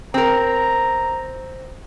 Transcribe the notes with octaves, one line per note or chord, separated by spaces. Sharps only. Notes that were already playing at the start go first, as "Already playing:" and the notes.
C4 A#4 A#5